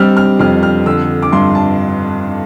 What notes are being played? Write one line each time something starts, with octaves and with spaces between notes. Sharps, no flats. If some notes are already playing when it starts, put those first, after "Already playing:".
Already playing: G3 C4 E6 F6
F6
F2 F6
F6
D3 E6
D6
G2 C6
A5